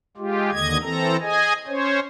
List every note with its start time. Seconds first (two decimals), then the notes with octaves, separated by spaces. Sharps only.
0.17 G#3 F4 G4
0.52 D#2 D3 D#5 G#6
0.82 E3 C4 A4 A#5
1.21 G#4 D#5 G#5
1.67 C#4 C5 C#5